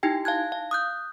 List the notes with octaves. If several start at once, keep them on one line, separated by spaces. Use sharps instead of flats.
D#4 E4 G4 G5 G#5
F5 A5 F#6 G#6
F5
D#6 F#6 G6